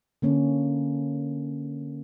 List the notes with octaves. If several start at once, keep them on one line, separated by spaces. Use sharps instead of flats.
D3 A#3 C#4